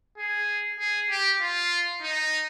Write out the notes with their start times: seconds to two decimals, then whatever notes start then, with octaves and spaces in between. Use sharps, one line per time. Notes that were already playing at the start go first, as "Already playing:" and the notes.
0.18 G#4
0.79 G#4
1.10 G4
1.41 F4
2.02 D#4